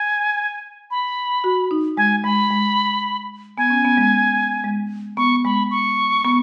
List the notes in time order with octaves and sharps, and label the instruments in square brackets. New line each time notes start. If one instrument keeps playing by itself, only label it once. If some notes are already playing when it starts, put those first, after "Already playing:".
Already playing: [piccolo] G#5
B5
[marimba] F#4
D#4
[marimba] G#3 [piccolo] G#5
[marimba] G#3 [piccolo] B5
[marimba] G#3
[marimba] B3 [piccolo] G#5
[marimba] C#4
B3
G#3
G#3
[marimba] B3 [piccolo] C#6
[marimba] G#3 [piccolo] B5
[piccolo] C#6
[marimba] B3